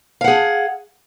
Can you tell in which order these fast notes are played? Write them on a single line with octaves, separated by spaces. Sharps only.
F5 F#5 G#4